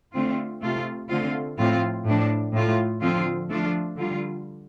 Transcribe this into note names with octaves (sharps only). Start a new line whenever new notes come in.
D3 A3 C4 F4
C3 A3 F4
D3 A3 C4 F4
A2 F3 C4 F4
A2 F3 D4
A2 A3 F4
D3 F3 C4 F4
F3 A3 D4 F4
D3 G3 F4